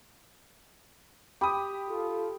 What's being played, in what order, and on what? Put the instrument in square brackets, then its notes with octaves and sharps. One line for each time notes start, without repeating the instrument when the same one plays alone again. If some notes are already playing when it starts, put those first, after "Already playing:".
[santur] G4 [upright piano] B5 D#6
[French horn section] F4 A4